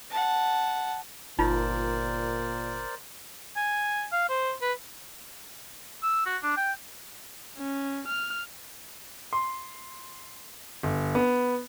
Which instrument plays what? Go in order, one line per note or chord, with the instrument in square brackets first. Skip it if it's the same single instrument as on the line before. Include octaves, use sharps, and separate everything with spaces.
[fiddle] F#5 A5
[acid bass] G1 [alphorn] A#2 [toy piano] D#4 F4 [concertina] A#4 C5 D5
[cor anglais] G#5
F5
C5
B4
[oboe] E6
F#4
D4
G5
[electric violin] C#4
F6
[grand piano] C6
G1
B3